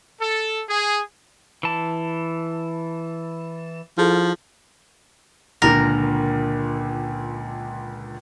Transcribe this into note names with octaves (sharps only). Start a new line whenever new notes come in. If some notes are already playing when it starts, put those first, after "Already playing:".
A4
G#4
E3 A5
F3 E4 G#4 A4
C#2 A#2 D3 A#4